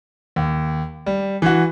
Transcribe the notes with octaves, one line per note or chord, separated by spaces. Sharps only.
D#2
G3
E3 F#4